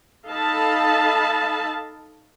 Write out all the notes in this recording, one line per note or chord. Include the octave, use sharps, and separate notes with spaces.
D#4 A4 D#5 F5 A5 B5